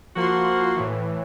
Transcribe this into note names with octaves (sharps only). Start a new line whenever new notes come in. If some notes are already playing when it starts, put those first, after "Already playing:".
F3 A#3 F#4 C6
A2 E3